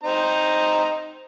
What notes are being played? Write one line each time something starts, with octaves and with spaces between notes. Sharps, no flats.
C4 D#4 A#5